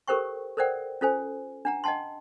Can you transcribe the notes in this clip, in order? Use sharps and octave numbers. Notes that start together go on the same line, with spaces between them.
G4 A4 A#4 C5 G5 C#6
A4 A#4 C5 D5 F#5 G5
C#4 F4 A4 C5 G#5
D4 F#5 A#5
D#5 F#5 G5 A5 C6